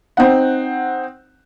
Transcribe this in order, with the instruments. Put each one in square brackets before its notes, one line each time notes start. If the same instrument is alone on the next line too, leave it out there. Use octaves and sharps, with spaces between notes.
[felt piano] C4 D#4 F#5